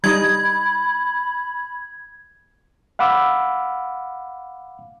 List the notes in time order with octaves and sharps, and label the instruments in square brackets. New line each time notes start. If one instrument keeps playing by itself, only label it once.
[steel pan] G3 D#4 D#5 [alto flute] B5 [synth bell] G#6
[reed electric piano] F5 F#5 B5 D6 E6